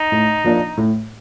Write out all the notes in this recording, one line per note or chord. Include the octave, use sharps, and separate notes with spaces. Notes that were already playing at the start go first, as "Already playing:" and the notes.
Already playing: D#4
A2
F3 A#3 D4
A2